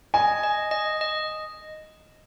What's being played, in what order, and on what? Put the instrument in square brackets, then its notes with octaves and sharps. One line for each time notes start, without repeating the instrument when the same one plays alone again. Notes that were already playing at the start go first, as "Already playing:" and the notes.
[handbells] D#5 [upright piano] G#5
[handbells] D#5
D#5
D#5